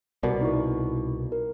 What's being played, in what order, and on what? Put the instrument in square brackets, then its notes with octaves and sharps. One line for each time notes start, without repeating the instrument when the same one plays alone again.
[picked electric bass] C2 B2 [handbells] A#4 D5
[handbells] D#4 E4 C#6
A#4